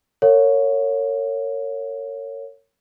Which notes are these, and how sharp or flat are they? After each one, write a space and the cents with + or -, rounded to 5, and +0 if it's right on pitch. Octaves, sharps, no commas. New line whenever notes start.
A#4 -40 C#5 +0 F5 +40